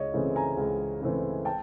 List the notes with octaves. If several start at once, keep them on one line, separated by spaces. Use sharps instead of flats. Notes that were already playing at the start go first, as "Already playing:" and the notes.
Already playing: C#2 C#5 D#5
C#3 E3 A3 C4
G#5 A#5
C#2
C#3 E3 A3 C4
G5 A5